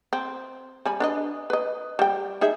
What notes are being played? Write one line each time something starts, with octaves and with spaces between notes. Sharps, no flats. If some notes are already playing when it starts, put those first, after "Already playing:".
C4
G3 G#5 B5
D4 B4 D#5
B4 D#5
G3 G5
D#4 G#4 E5